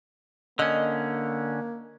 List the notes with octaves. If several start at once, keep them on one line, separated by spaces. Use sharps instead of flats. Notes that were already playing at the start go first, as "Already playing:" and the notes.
D3 A#3 C#4 D#5